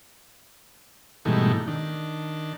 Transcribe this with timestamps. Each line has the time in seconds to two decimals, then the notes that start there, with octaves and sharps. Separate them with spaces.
1.25 G#2 B2 E3 G3 A3 D#4
1.68 D#3 D4